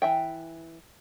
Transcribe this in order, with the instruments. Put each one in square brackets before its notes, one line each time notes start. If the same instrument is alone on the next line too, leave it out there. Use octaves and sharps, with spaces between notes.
[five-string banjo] E3 E5 G5